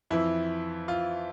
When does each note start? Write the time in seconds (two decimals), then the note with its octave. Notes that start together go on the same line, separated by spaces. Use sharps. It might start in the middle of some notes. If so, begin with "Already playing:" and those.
0.10 F2 E3 E4
0.88 F4